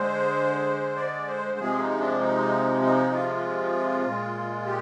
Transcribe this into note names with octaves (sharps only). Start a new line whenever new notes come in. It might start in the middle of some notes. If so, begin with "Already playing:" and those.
Already playing: D3 G#3 C5
D5
C5
C3 F3 G#3 G#4
D#4
D4
D#4
D#4
F4
A#2 G#3
G4